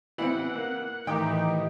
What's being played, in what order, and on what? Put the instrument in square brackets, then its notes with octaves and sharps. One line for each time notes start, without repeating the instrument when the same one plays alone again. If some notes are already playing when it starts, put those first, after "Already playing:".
[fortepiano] E3 B3 C4 [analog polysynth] F#5
[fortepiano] A#3
[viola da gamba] A2 E3 [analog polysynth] D#3 D#4 G4 [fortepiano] G5